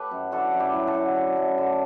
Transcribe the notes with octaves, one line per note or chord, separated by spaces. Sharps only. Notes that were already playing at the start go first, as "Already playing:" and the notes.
Already playing: G4 A4 B4 C#5
F#2
D3 F#4 A4
F#2
E4 G4
F#3
F#4 A4
D3
D3
F#2
D3